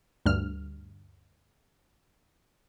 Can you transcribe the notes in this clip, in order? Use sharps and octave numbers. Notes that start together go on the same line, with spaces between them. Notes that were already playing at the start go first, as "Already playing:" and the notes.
D2 G2 F6